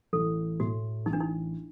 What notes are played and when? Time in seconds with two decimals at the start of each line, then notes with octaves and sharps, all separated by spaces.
0.13 A1 A4
0.60 A2 A3 F#4
1.06 A1 D#4
1.13 D4
1.20 D#4